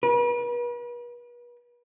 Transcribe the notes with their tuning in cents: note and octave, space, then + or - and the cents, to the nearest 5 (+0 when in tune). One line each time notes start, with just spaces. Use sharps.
B4 -40